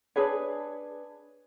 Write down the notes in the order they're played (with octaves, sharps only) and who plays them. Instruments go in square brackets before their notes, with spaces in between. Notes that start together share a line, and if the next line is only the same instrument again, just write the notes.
[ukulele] D4 G#4 B4 C#5